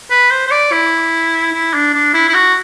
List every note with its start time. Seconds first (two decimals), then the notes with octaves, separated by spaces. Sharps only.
0.11 B4
0.31 C5
0.47 C5
0.51 D5
0.72 E4
1.53 E4
1.74 D4
1.94 D4
2.14 E4
2.29 E4
2.34 F#4